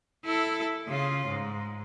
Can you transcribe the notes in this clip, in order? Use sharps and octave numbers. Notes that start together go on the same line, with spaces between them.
E4 A4
C#3 F4
G#2